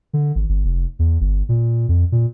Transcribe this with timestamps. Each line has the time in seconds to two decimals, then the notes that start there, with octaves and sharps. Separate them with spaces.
0.13 D3
0.35 G#1
0.49 G1
0.65 F1
0.99 E2
1.21 G1
1.49 A#2
1.89 F2
2.12 A#2